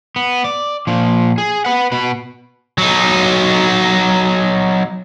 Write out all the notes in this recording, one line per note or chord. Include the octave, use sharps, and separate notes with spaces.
B3
D5
A#2 F3
G#4
B4 F#5
B2 B4
F#3 D#4